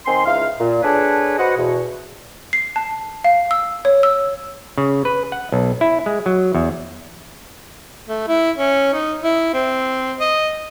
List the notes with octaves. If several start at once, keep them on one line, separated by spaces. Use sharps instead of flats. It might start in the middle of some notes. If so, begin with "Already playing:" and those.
D#3 C4 G#5 C6
C#2 D#4 E4 F5
A#2
D4 G#4 A4 B4 C#5
F#4 B4 C5 D#5 F#5
E2 B2
C7
A5
F5
E6
C#5
E6
C#3
B4
F#5
B1
E4
G#3
F#3
E2
A3
E4
C#4
D#4
E4
C4
D#5